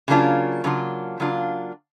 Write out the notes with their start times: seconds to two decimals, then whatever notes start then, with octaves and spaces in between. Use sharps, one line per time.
0.08 C#3 F#3 A#3 D4 F4
0.64 C#3 F#3 A#3 D4 F4
1.20 C#3 F#3 A#3 D4 F4